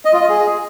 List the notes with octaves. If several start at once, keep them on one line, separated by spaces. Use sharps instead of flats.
D#5
F4
D#5
G#4